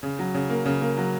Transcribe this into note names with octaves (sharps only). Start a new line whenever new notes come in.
C#3
F#3
C#3
A#3
C#3
A#3
F#3